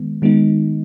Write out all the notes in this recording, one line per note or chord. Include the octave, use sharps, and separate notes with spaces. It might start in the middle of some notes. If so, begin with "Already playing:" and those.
Already playing: D#3 G#3 B3
D#3 G#3 B3 D#4